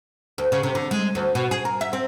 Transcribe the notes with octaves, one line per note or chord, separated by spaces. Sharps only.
D2
C#3
C3
D3
G#3
D2
B2
G#4
A#4
E5
C4